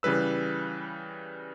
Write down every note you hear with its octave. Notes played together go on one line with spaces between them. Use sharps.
C#3 E3 G3 B4 E6